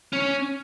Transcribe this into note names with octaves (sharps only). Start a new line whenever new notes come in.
C#4